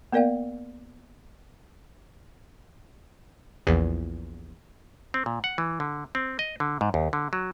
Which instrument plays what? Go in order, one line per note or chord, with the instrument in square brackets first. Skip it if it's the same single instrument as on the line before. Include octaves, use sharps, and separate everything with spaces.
[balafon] A#3 B3 A#4 D5 F5 G5
[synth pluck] A#1 E2
[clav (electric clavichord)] C4
A#2
F#5
E3
D3
C4
D#5
D3
G#2
D#2
D3
F#3